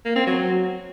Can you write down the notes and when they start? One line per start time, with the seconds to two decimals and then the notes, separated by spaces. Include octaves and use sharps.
0.05 A#3
0.16 C4
0.27 F#3